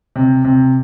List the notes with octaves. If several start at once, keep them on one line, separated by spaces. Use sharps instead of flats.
C3
C3